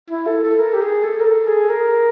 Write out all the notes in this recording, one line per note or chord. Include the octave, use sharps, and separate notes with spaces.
E4
A4
A4
A#4
G4
G#4
A4
A#4
A4
G#4
A#4